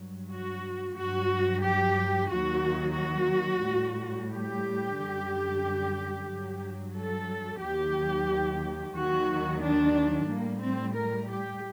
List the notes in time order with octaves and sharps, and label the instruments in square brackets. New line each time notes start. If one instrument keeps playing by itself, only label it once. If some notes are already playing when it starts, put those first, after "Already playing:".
Already playing: [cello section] G2 F#3
F#4
G2 F#3 F#4
G4
D#2 D#3 F#3 F#4
F#4
A2 G3
G4
F#2 D3 G3
G2 F#3
A4
D#2 D#3 F#3 G4
D#2 D#3 F#3 F#4
D4
A2 G3 A#3
C4
A#4
G4